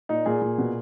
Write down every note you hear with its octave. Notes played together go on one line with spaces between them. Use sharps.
A#2 D#4
A#2 G#4
A#2
B2